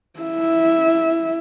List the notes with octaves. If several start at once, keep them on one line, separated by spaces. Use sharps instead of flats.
E4 E5